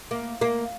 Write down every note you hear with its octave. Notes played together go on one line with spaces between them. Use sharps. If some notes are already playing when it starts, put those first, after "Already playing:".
A#3
A#3